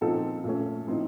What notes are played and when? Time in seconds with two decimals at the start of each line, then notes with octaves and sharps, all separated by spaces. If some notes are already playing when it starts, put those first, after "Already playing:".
0.01 A#2 F3 C4 D#4 A4
0.44 A#2 A3 C#4
0.87 A2 F3 C4 D#4